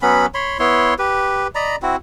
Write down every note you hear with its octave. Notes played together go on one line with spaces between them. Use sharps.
F#3 B3 C#4 B5
C#5 B5 C6
B3 E4 C#5 C6
G4 B4
D5 D#5 A#5 B5
C4 E4 F#4